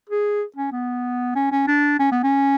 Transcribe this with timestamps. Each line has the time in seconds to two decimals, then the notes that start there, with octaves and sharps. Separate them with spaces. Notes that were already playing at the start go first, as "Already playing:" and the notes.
0.10 G#4
0.56 C#4
0.72 B3
1.35 C#4
1.52 C#4
1.68 D4
1.99 C#4
2.12 B3
2.24 C#4